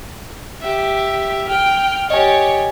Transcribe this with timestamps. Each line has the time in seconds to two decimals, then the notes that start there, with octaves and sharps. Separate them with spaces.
0.61 G4 E5
1.49 G5 F6
2.10 G4 C#5 D#5 G#5